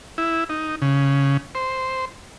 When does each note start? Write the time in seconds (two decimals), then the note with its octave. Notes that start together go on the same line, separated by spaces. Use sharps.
0.18 E4
0.49 D#4
0.82 C#3
1.55 C5